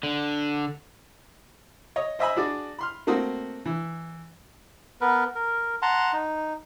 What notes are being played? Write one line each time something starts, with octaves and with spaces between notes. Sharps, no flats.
D3
C#5 D#5
C5 D#5 E5 G#5 B5
D4 F#4 G#4 D5
B5 C6 F6
A3 A#3 C4 F#4 D#6
E3
B3 A#4 B4
A#4
F#5 A5 A#5 C6
D#4